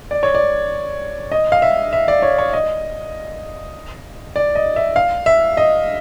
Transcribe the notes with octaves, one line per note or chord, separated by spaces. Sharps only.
D5
C#5
D5
D#5
F5
E5
E5
D5
C#5
C#5
D#5
D5
D#5
E5
F5
E5
D#5